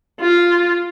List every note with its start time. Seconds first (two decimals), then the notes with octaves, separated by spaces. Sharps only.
0.20 F4